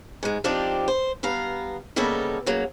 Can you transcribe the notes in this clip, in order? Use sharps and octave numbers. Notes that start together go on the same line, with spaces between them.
G#2 G#3
F3 C4 D4 D#4 G4 D5
C5
G2 B3 F5 A#5
C#3 G3 A#3 B3 A4 D#5
C#3 F#3 A#3